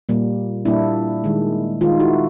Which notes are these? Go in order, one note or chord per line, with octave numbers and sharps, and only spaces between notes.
A#2 G3 A#3
A#2 G3 A#3 D4 E4
D#3 G#3
D#3 G#3 D#4 F4
E4 F#4